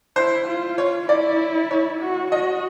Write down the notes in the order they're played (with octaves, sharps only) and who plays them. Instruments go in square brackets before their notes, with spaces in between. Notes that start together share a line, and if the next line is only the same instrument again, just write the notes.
[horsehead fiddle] E4 [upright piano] C5
[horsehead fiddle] F4
[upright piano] C#5
[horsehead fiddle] E4 [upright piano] D5
[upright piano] C#5
[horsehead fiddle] F#4
[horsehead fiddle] F#4 [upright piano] D#5